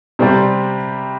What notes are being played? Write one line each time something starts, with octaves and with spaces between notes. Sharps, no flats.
C3 G3 C4 G4 D5